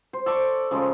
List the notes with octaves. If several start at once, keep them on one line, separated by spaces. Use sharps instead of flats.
C5
A4 D5 C#6 D6
C#3 F3 G#3